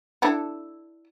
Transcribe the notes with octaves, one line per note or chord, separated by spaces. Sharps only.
D4 E4 A4